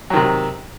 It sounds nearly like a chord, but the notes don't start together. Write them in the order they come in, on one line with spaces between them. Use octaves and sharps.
F#3 D#3 C3